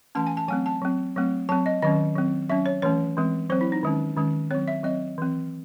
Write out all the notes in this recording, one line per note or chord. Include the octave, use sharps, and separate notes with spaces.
E3 A3 C#4 A5
G#5
A5
F#3 A3 C4 G#5
A5
F#3 C4
F#3 A3 C4
F#3 C4 A5
D#5
D#3 F#3 C#4 D#5
F#3 C4
F#3 C#4 E5
C#5
E3 A3 C#4 C#5
E3 G#3 C4
F#3 C4 C5
E4
D#4
D#3 G#3 C#4
D#3 G#3 C#4
F#3 C4 C#5
E5
F#3 C4 D#5
E3 C4